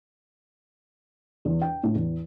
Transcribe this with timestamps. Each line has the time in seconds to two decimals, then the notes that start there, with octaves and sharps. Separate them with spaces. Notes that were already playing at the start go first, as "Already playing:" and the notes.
1.45 E2
1.61 G5
1.83 A2
1.95 E2